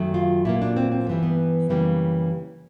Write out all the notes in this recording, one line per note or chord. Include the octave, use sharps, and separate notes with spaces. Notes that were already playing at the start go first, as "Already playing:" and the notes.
Already playing: F#2 D#3 F#3 A3
F4
A#2 F#3 A#3 E4
D4
C4
C4
G2 E3 G3 A#3
B3
F#2 C#3 E3 G3 A#3